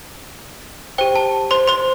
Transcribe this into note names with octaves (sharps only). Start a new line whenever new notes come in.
G4 C5 G5
A5
C5 C6
C5 C6